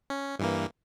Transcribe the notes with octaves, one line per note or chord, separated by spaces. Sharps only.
C#4
G2 E3 A#3